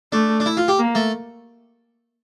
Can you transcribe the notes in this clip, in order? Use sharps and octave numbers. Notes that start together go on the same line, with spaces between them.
A3 D4
D4
E4
F4
G4
A#3
A3